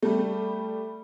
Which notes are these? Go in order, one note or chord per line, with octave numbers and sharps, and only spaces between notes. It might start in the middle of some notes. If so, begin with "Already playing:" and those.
G3 A3